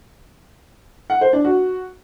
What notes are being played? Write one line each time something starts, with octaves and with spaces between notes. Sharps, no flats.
F#5
C5
D4
F#4